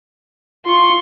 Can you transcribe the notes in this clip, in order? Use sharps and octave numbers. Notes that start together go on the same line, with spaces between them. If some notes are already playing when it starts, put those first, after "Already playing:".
F4 C6 C#6